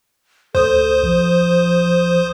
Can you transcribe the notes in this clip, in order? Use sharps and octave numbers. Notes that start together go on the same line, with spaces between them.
D2 A4 C5 D#6
A#1 F3